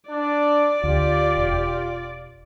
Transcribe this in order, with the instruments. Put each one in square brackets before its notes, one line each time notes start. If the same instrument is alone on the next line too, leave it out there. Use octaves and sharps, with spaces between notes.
[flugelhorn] D4 [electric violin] D5
[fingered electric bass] D2 [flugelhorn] F4 [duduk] G4
[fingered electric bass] E1